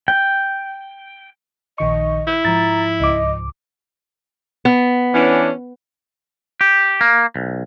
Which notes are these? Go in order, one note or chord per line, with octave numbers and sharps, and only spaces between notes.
G5
A#1 D#3 D#5 C#6
E4 G6
G#2 F3 A#5 A6
C#2 D#5 D6
B3
E3 C#4 D4
G4
A#3
B1